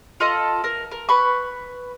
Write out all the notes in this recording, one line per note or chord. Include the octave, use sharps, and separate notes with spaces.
F4 A4 D#5
A#4
A#4
B4 B5 C#6